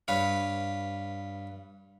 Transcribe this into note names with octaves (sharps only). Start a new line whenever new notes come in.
G2 B4 C#5 F5